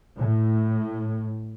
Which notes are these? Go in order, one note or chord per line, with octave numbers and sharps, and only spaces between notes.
A2